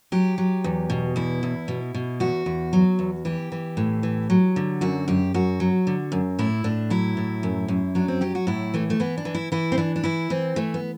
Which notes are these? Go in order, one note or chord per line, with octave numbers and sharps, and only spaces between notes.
F#3 G4
F#3
E2
B2
E2 E4
E2
B2
B2
E2 F#4
E2
F#3
E2
E3 G4
E3
A2
E3
F#3
D3
F#2 F#4
F#2 G4
F#2 F#4
F#3
D3
F#2
A2 E4
A2 D4
F#3 E4
A2
F#2
F#2
F#3 D4
C4
F#3 G4
F#4
A2 E4
E3 A3
A3
E3 B3
D4
E3
E4
E3 E4
C4
E3 D4
D4
E3 E4
E3 C4
E3 A3
B3